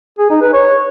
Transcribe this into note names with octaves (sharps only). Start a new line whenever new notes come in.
G#4
D#4
B4
C#5